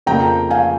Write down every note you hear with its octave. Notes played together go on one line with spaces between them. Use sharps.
F2 C#3 F3 A#3 G5 A#5
F5 G#5